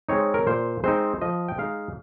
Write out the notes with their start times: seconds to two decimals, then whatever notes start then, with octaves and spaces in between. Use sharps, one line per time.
0.09 G#3 C4 D#4 C#5
0.34 A#4
0.47 A#2 C5
0.84 G#3 C4 D#4 C5
1.21 F3 D#5
1.48 G5
1.58 G#3 D#4 F5